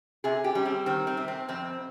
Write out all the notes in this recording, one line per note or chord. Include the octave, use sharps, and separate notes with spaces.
C3 G#4
G4
G3 C#4
C4
D#3 C4
C4
C3
C4
F2 C4